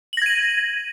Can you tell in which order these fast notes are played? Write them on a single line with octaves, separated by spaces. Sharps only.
F#7 A#6 G#6 D#7